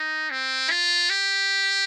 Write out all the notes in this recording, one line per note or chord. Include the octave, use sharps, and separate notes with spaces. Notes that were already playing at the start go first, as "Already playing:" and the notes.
Already playing: D#4
C4
F4
G4